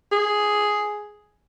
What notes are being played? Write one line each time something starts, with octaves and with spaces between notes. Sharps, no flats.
G#4